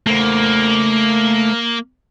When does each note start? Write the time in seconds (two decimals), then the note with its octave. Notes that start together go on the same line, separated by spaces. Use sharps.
0.07 A3 A#3 C5